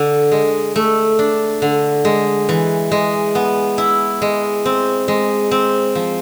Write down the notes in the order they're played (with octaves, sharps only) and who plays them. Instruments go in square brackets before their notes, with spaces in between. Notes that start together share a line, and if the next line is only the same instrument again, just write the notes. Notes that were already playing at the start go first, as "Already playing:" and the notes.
Already playing: [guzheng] D3
G#3
A3
D4
D3
G#3
E3
G#3
B3
E4
G#3
C4
G#3
C4
F3